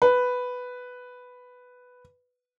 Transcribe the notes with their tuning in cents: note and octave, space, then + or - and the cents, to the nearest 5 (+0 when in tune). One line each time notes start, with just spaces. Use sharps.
B4 +5